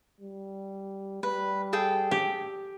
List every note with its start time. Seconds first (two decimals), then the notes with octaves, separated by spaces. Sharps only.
0.21 G3
1.23 G3 B4
1.73 G#4 A4 G5
2.11 G4